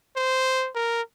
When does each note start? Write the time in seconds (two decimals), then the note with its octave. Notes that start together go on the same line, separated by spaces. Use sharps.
0.16 C5
0.75 A#4